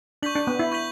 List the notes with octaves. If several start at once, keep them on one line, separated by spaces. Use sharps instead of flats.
D4 C#6 G6 B6 F#7
D4
B3
E4
C#6 G6 B6 F#7